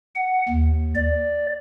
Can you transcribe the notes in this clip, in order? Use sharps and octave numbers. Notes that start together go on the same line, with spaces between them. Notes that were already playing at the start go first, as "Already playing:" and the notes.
F#5
D#2
D5